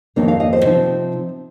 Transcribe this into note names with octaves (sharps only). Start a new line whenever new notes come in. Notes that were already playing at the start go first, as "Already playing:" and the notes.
F2 D#3 A#3 D#4
F5
D#5
C5
C3 F3 C4 D#4